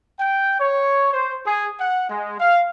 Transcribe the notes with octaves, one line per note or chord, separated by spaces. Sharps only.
G5
C#5
C5
G#4
F#5
G#3
F5